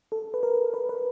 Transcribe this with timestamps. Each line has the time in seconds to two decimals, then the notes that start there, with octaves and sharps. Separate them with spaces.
0.12 A4
0.34 B4
0.43 A#4
0.74 B4
0.89 B4